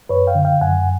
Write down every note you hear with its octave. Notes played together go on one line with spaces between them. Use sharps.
F#2 B4 C#5
F5 G5
D3
F5 G5
F#2 F#5 G#5